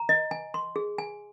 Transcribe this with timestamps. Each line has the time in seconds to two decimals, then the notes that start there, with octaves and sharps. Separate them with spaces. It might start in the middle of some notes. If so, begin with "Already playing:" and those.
Already playing: A#5
0.09 D#5
0.31 G#5
0.54 C6
0.76 G#4
0.98 G#5